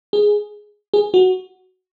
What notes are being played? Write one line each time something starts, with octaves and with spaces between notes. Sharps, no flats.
G#4
G#4
F#4